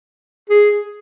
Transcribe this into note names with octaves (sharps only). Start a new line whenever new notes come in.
G#4